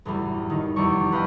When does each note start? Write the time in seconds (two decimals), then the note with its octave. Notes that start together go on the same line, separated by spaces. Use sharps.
0.05 F#1 E2 A2 G3
0.50 D#3 D#4
0.76 F1 E2 G3 D5 C#6
1.12 B4 D#5 F5 G5